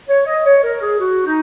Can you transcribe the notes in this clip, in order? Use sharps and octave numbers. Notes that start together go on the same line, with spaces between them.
C#5
D#5
C#5
A#4
G#4
F#4
D#4